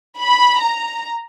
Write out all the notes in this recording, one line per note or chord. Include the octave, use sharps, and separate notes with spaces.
B5
A#5